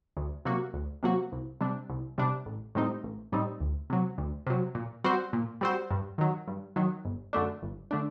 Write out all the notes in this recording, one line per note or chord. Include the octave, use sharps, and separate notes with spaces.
D2
C3 F#3 A#3 F#4
D2
C3 F#3 A#3 F#4
C2
C3 G3 D4
C2
C3 G3 D4
A1
A2 G3 C4 D#4
A1
A2 G3 C4 D#4
D2
C3 F#3
D2
C3 F#3
A#2
G3 C4 F#4 C5
A#2
G3 C4 F#4 C5
G2
D#3 F#3
G2
D#3 F#3
G1
F#2 D3 A3 D4
G1
D3 A3 D4